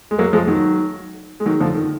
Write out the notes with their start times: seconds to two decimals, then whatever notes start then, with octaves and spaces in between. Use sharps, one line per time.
0.11 G#3
0.19 F#3 A#3
0.33 F3 G#3
0.47 D#3 F#3
1.40 G#3
1.46 D#3 F#3
1.60 D3 F3
1.74 D#3